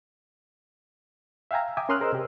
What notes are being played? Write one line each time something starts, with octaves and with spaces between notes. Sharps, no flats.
E5 F5 G5 G#5 A#5
E5 G5 G#5 D6 D#6
C#4 A#4 C6 D#6 F6 F#6
G#4 A#4 C5 D#5 E6
C3 G4